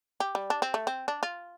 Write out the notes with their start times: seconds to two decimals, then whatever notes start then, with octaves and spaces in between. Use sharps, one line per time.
0.20 G4
0.35 G3
0.50 D4
0.62 C4
0.74 A3
0.87 C4
1.08 D4
1.23 F4